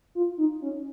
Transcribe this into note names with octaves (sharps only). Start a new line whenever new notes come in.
F4
D#4
C#4